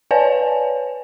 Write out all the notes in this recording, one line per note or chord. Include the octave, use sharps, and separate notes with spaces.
B4 C#5 D5 F5 G#5 A5